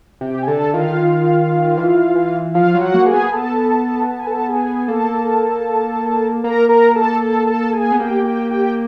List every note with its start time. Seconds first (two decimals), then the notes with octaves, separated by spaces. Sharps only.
0.21 C3 G4 G5
0.42 G#5
0.47 D3 A4 A5
0.73 D#3 F4 F5
1.77 E3
2.15 E3
2.54 F3 F4 F5
2.75 F#3
2.80 F#4 F#5
2.94 A#3
3.06 G#4 G#5
3.13 B3
3.32 A4 A5
4.10 A5
4.19 G#5
4.27 A4 A5
4.48 G#4 G#5
4.88 A#3 A4 A5
6.43 A#3 A#4 A#5
6.69 A#4 A#5
6.95 A4 A5
7.21 A4 A5
7.47 A4 A5
7.73 G#4 G#5
7.92 B3
7.99 A#3 G4 G5
8.24 G4 G5
8.51 G4 G5